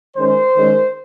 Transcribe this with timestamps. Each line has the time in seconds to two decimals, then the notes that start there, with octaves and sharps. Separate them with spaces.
0.17 D#3 G#3 C#4 C5
0.56 D#3 G#3 C#4